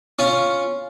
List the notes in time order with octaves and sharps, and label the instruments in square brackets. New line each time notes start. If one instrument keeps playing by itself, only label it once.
[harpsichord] C#4 F4